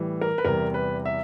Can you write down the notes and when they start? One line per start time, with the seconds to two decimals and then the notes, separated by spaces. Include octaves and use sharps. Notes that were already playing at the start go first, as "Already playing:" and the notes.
Already playing: A2 E3 G3
0.21 A#4
0.38 B4
0.45 E2 C3 E3 G3 A#4
0.74 B4
1.05 E5